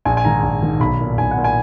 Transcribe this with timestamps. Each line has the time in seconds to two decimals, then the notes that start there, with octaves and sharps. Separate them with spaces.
0.05 A#1 G#5
0.17 G#5
0.24 G#2 D#3 A#5
0.43 A#1
0.62 G#2 D#3
0.80 B1 B5
1.00 A#2
1.18 B1 G#5
1.31 F#5
1.37 A#2
1.44 G#5